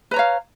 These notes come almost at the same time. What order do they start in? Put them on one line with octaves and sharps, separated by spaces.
B4 A#5 C#5 F5